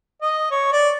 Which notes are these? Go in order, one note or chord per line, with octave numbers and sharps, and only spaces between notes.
D#5
C#5
D5